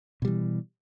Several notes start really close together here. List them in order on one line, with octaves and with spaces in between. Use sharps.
B2 G3 E3